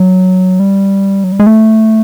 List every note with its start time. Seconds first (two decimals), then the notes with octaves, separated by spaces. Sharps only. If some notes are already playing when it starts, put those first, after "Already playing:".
Already playing: F#3
0.60 G3
1.24 F#3
1.32 G3
1.40 G#3
1.47 A3